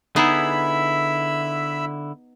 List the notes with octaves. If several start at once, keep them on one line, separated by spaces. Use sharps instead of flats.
D3 B3 D#4 E4 G#4 E5 B5 E6